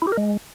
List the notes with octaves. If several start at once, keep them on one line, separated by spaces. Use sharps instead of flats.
E4
G4
A#4
G#3